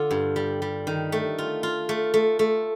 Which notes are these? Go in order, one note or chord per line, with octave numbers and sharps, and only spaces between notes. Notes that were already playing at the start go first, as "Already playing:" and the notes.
Already playing: D3 F4
G2
G3
G3
D#3
A3
F4
F4
A3
A3
A3